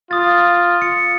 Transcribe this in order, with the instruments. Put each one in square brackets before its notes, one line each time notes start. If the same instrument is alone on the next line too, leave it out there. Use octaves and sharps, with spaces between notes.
[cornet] F4 [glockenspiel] D#6 A6
[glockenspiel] C#7